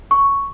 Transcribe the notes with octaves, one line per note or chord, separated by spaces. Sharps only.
C#6